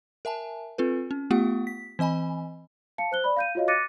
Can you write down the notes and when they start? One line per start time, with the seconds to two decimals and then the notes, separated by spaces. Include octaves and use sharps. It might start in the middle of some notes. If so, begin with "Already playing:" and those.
0.25 A#4 E5 G#5 A5
0.78 C4 F4 A4 B4
1.11 C#4
1.30 A3 B3 F4 G4 F#5
1.67 B6
1.99 E3 C4 D#5 G#5 B5
2.98 F5 A5 C#7
3.12 C5 F#6 G7
3.24 D5 B5
3.37 F5 G6 D#7
3.55 F4 F#4 C#5 D#5 F5
3.68 D6 F#6 A6 A#6 C#7 D#7